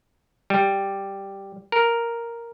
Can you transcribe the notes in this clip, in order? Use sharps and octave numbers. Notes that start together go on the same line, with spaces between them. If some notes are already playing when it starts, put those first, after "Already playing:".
G3
A#4